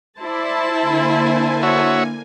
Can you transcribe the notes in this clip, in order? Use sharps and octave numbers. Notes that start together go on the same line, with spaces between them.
E4 C5 D5 A5
D3 A#3 G#5
F#4 C#5 E5